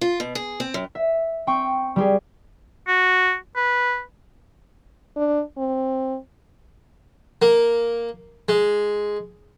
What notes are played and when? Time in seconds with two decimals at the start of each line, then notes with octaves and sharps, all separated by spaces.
0.01 F4
0.20 B2
0.35 G#4
0.60 C4
0.74 F#2
0.95 E5
1.47 C4 G5 C#6
1.96 G3 G4 G#4
2.88 F#4
3.56 B4
5.17 D4
5.58 C4
7.42 A#3
8.49 G#3